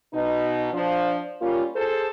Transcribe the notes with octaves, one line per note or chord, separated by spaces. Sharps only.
B2 D#4
F3 D4
G3 A#3 C#4 F4
G#4 A4 C5